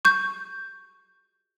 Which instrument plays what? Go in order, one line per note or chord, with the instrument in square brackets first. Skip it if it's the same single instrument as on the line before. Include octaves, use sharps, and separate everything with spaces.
[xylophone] C#6 G6